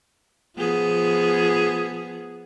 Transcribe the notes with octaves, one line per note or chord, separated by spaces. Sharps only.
F3 B3 G#4